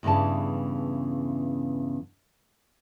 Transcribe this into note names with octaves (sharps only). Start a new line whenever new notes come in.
E2 G2 C#3 E3 A5